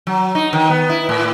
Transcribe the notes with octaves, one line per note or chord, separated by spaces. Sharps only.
F#3
D#4
D#3
B3
E4
A2